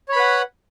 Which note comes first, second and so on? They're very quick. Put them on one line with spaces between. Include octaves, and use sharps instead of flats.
C#5 B5 B4 F#5